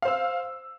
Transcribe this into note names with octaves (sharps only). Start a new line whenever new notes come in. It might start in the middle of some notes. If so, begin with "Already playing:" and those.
C5 F5 E6